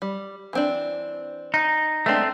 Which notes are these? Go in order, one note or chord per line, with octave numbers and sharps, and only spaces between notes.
G3
E3 C4 D4
D#4
G#3 A3 B3 C4 D4